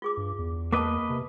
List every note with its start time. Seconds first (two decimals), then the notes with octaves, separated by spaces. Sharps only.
0.02 F4 G#4 D6
0.17 G2
0.38 E2
0.73 A#3 B4 D#5 A5 D6
1.10 C3